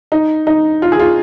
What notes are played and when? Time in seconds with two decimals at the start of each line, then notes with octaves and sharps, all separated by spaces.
0.12 D#4
0.47 D#4
0.82 F4
0.92 G#4
1.00 F4